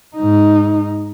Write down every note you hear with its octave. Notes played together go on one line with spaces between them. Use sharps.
G#2 D#4